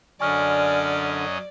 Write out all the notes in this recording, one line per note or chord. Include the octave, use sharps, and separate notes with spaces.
F#2 D3 C#4 D5 D#5 G#5 C#6 F6